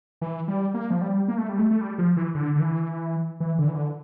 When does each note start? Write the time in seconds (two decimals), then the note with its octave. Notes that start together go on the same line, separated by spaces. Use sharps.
0.22 E3
0.48 G3
0.74 A#3
0.91 F3
1.01 G3
1.28 A#3
1.38 A3
1.49 G3
1.59 A3
1.71 A3
1.81 G3
1.98 F3
2.17 E3
2.35 D3
2.56 D3
2.60 E3
3.40 E3
3.59 D3
3.68 E3
3.76 D3